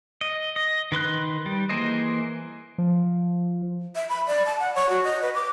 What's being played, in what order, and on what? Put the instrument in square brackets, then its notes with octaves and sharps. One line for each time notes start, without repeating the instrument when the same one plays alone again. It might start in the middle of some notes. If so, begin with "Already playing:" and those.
[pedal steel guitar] D#5
D#5
D#3 B4 C6 F#6
G3
E3 A#3 G#4 C5 D#5
[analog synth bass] F3
[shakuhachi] E5
B5
D5
A5
F#5
C#5
F#4
D#5
B4
D6